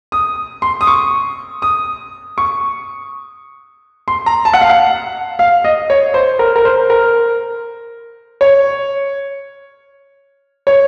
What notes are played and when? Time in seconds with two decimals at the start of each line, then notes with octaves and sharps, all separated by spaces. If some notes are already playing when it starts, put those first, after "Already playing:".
0.12 D#6
0.62 C6
0.81 D#6
0.87 C#6
1.62 D#6
2.38 C#6
4.08 C6
4.26 A#5
4.45 A5
4.53 F#5
4.61 F5
4.70 F#5
5.39 F5
5.64 D#5
5.90 C#5
6.14 C5
6.39 A#4
6.56 A#4
6.65 C5
6.90 A#4
8.41 C#5
10.67 C#5